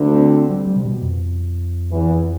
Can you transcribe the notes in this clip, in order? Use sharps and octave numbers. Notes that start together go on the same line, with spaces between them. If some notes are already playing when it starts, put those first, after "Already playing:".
Already playing: D2 D3
C4
G3
G3
C3
B2
F2
E2 E3